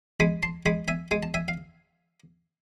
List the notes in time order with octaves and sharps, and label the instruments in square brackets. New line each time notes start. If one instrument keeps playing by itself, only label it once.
[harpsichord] G#3 G#5 B5
A5 C6
G#3 G#5 B5
E5 G#5
G#3 G#5
A5
E5 G#5
F5